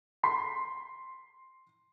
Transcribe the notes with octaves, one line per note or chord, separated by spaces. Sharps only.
C6 B6 C7